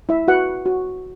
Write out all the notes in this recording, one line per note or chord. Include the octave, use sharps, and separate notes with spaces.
E4 E5
F#4 B4 F#5
F#4